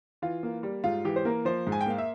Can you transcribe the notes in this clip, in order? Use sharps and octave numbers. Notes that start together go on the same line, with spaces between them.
E3 F4
A#3
G3
G#2 F4
E3 G4
C5
A#3 A#4
F3 C5
G#2
G#5
G5
A#3 F5
E5